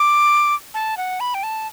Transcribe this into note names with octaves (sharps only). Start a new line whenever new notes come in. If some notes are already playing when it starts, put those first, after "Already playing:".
Already playing: D6
A5
F#5
B5
G5
A5